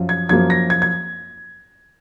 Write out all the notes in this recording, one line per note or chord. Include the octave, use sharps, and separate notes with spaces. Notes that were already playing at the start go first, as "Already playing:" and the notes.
Already playing: F#2 F3
G#6
F#2 F3 A#3 G#6
A#6
G#6
G#6